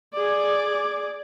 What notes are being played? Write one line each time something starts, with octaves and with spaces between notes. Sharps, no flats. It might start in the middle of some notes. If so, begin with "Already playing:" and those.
G#4 D5